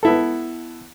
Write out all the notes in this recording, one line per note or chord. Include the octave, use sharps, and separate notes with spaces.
B3 E4 A4